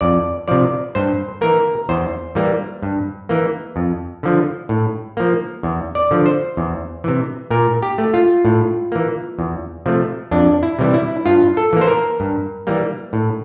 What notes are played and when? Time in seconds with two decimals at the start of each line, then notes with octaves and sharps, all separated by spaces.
0.01 F2 D5
0.48 C3 F3 D5
0.95 G2 C5
1.41 E3 A#3 A#4
1.89 E2 C5
2.35 E3 G3 A#3
2.83 G2
3.29 E3 A#3
3.76 F2
4.23 D3 F3
4.69 A2
5.17 F3 A#3
5.63 E2
5.95 D5
6.11 D3 F3
6.26 C5
6.57 E2
7.04 C3 E3
7.50 A#2 A#4
7.83 G4
7.98 A3
8.14 F4
8.45 A2
8.92 E3 A#3
9.39 E2
9.86 C3 F3 A3
10.31 F2 D4
10.63 E4
10.79 C3 E3 G3
10.94 E4
11.26 G2 F4
11.57 A4
11.73 E3 A#3
11.81 C5
11.88 A#4
12.20 G2
12.67 E3 G3 A#3
13.13 A2